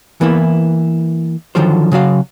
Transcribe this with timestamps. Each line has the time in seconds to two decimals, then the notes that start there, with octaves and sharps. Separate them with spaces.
0.21 E3 A#3 B3 E4
1.55 D3 D#3 F3 F#3 F4 C5
1.92 C#3 F#3 F#4 F5